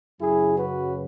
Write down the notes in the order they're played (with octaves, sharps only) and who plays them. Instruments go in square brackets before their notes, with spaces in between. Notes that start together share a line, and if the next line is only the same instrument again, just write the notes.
[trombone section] F#2 C#3 F#3 E4 G#4
F#4 B4